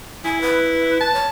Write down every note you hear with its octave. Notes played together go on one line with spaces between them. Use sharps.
E4 G#5
B4
A5
C#5